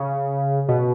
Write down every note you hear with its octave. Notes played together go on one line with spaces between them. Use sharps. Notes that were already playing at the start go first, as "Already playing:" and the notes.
Already playing: C#3
B2